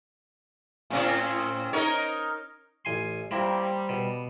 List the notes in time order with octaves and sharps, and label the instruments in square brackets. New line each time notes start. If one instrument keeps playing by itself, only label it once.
[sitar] A2 C4 C#4
D#4 A#4 C#5
[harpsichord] A1 G#5 C6
[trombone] G3 [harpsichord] A#3 C4 E4 [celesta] C5 A#5 C6
[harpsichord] B2 [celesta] B4